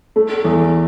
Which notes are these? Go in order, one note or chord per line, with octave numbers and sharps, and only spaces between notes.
A3
E2